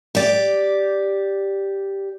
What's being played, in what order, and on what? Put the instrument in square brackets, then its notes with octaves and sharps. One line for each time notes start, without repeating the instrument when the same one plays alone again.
[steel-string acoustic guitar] G4 D5